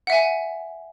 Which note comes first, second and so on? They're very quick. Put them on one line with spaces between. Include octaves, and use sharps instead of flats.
F#5 E5 G#5